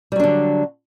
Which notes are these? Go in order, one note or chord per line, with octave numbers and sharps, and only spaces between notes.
D3 F#3 G3 D4